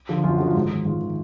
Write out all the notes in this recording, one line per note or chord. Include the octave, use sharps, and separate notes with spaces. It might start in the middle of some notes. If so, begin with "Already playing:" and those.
D3 F3
F#2 F4
D3 F3 F#4
F4
G#2
D#3
G#2 F4
D#3